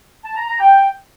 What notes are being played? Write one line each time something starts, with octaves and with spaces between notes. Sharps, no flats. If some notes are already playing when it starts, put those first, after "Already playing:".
A5
A#5
A#5
G5